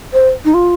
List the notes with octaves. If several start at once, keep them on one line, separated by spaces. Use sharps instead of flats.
C5
D#4
F4